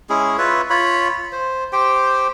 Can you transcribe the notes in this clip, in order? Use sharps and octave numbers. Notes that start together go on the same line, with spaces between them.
G#3 C#4 E4 G#4
F4 B4 C#5 E5
F4 C#5 B5
C5
G4 C5 G5